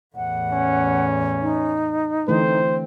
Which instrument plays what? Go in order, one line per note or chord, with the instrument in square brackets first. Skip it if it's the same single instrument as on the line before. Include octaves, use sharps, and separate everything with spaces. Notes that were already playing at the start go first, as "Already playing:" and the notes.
[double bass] E2 A2 [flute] F#5
[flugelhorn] C#4
[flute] D#4
[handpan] D3 E3 A3 [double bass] C4 [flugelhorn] C5